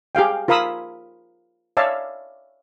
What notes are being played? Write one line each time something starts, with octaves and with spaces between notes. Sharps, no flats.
G4 G#4 F5 G5
F4 A#4 F5 B5 D#6 E6
C#5 D5 E5 F5 A5